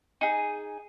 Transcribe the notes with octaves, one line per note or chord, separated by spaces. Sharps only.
D#4 G#4